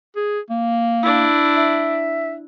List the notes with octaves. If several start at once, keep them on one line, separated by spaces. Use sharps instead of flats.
G#4
A#3
D4 E4
E5